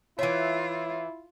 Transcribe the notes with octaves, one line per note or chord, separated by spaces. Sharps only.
E3 E4 F4 C#5 E5